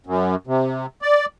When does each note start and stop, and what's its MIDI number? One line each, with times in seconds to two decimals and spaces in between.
0.06 0.35 42
0.47 0.86 48
1.02 1.26 74